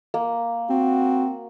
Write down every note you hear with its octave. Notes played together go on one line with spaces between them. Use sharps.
A#3
C4 F#4